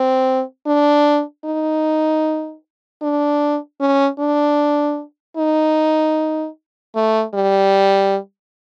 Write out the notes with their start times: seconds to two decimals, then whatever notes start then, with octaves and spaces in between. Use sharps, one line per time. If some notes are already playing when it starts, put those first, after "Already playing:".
Already playing: C4
0.67 D4
1.45 D#4
3.02 D4
3.81 C#4
4.20 D4
5.37 D#4
6.95 A3
7.34 G3